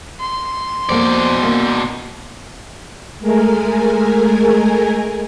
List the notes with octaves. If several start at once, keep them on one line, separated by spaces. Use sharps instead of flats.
C6
F2 B2 A#3 D5
A#3
G#3 A3 A#4 G#5